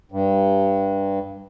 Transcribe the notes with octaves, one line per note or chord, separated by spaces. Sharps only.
G2